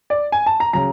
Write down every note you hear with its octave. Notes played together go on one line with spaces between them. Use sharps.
D5
G#5
A5
A#5
C#3 F#3 A#5